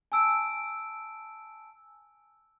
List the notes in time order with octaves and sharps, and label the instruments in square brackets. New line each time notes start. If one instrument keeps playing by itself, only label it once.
[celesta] G#5 A5 E6 D7